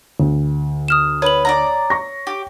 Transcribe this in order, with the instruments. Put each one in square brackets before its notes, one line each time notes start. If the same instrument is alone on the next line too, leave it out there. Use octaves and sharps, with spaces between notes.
[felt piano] D2
[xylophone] D#6 F6 E7
[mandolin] B4 [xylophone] C#5 F#7
[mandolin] D5 E5 A#5
[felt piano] C#6 A#6
[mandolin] G4